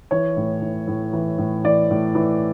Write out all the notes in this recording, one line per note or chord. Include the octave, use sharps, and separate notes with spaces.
E3 C#5
A2
E3
A2
E3
A2
E3 D5
A2
E3